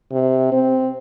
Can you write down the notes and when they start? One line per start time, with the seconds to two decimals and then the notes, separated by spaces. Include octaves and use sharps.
0.12 C3
0.53 C4